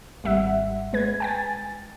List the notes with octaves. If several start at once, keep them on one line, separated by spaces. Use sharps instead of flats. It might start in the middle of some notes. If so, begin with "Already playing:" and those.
G#1 G3 E5 F#5
G#3 B4 G#6
G5 G#5 A6